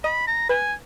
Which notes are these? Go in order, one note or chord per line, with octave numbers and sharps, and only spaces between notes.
D#5 B5
A#5
B4 G#5